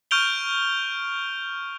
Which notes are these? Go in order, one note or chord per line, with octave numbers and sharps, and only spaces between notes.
C#6 F6 G6 D7 F7 G7